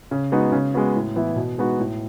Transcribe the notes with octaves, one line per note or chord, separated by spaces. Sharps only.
C#3
G#3 B3 D#4 F#4
C#3
G#3 B3 F#4
A2
E3 B3 E4
B2
G#3 B3 D#4 F#4
A2